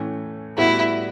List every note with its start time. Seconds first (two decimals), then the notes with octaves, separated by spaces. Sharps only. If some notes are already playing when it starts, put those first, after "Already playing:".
Already playing: A2 E3 A3 C#4
0.58 A2 G3 B3 E4 F#4 B4